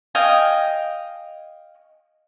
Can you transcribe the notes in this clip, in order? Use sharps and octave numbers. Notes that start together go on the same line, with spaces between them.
D#5 F5 G5 G#5